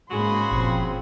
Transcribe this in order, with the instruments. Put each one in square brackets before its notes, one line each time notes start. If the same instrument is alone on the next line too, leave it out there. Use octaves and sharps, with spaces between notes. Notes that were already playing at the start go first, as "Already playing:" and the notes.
[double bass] G#2 A#3 [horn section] C#3 F#4 G#4 [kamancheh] B5 C6
[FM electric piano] G1 A#2 [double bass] F3 C4